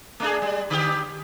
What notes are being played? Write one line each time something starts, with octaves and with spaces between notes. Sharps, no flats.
A3 D4 G#4
G3
D3 G4